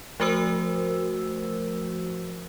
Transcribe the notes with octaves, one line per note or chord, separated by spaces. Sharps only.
F3 A3 F#4 A#4 C5 E6